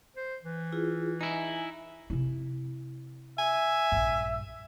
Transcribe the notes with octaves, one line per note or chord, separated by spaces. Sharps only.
C5
E3
E4 F4 G#4
D#4 E4 G#5
C3 E4
E5 G#5
A#1 G2